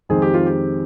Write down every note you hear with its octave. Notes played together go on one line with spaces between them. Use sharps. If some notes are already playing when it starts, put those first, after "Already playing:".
F2 D#3 G#3 C4 G#4
G4
F4
G4